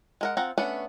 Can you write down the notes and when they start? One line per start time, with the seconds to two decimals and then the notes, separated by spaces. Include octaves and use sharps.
0.21 G#3 A#4 F#5
0.37 C4 F4 F#5 A#5
0.58 A3 B3 C#4 D4 B4